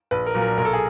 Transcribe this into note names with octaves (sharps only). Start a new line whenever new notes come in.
A#1 B4
A#4
A#2 F#3 A#3
A#4
B1 A#4
A4
G#4